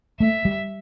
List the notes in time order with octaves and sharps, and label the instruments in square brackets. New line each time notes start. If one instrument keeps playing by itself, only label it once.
[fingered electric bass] A3 [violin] E5
[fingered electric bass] G3